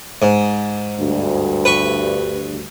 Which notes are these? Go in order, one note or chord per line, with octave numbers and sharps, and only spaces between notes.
G#2
D2 G2
B4 C#6